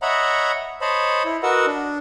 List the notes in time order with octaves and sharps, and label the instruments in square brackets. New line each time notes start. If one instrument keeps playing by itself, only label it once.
[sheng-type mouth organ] C#5 D#5 E5 F#5 A#5 B5
C5 C#5 D#5 A5 B5
E4
F#4 A#4 B4 D#5 F#5 E6
D4